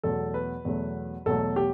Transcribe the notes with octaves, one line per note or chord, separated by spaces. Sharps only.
E2 B2 F#3 A3 A4
B4
E2 B2 F#3 A3
E2 B2 F#3 A3 A4
G4